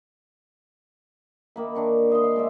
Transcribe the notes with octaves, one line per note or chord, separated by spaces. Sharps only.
D#3 A#3 B5
D#3 D4 C#6
C5 D#5 F5 C6
F5
G#3 D5 E5